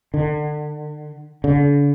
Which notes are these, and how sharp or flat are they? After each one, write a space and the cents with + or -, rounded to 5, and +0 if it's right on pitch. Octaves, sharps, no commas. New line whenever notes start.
D3 +35
D3 -40